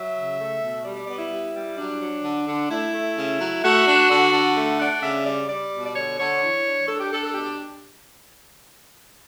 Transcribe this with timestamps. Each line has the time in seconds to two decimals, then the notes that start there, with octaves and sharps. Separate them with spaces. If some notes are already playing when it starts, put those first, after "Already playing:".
Already playing: F#3 E5
0.14 C#3
0.38 A3
0.61 B2
0.84 G3 D5
0.96 D5
1.07 B3 D5
1.19 E4
1.30 G3
1.54 G3
1.77 F#3 D4
2.01 F#3
2.23 D3
2.46 D3
2.69 A3 E4
2.93 A3
3.16 C#3
3.40 F#3
3.63 A3 F#4
3.85 D4
4.09 D3
4.32 D3
4.55 A3
4.79 D4 F#5
5.02 C#3 E5
5.25 G3 D5
5.49 G3 D5
5.72 B2
5.85 D5
5.95 D3 C#5
6.18 D3 C#5
6.42 E3
6.65 D4
6.88 D4 A4
6.99 G4
7.11 D4 A4
7.23 A4
7.34 B2 G4